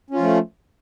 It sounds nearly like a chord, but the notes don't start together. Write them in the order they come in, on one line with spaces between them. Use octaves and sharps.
C#4 F4 F3 A3